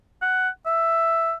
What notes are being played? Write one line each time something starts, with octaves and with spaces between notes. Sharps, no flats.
F#5
E5